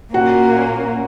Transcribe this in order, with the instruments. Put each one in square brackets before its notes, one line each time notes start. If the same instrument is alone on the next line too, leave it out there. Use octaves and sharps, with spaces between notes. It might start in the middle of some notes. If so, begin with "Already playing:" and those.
[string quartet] A#2 A#3 C#4 [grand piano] F#4 F#5